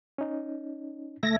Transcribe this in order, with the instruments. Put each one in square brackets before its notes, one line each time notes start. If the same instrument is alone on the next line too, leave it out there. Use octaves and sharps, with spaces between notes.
[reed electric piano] C#4 D#4
[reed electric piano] C#2 E5 G#6 [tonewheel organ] A3 A#6